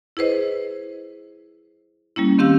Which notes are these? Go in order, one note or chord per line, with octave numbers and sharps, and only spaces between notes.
E4 G#4 B4 C5 D#5
G3 A#3 C#4 E4
D#3 C4 C#4 G4 F5 E6